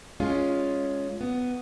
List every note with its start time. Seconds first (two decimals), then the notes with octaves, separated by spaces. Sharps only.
0.20 G#3 C#4 F4
1.21 B3